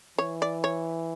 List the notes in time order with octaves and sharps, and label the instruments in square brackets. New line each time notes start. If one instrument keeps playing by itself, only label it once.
[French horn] E3 [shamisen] C#5
[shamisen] D5
C#5